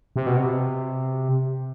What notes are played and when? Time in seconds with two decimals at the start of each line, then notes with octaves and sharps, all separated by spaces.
0.16 C3
0.27 B2
0.37 C3